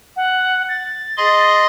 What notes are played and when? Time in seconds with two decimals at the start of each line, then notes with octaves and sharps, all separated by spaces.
0.16 F#5
0.69 A6
1.17 G#4 D#5 C6